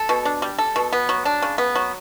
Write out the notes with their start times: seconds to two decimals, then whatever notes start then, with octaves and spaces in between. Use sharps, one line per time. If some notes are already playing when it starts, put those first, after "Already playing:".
Already playing: A4
0.09 B2
0.25 D4
0.42 G3
0.58 A4
0.76 B2
0.93 B3
1.09 F#3
1.25 D4
1.42 C#3
1.58 B3
1.75 F#3